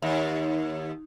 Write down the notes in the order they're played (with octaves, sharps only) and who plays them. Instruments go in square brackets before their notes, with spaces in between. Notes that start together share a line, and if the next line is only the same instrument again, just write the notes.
[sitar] D#2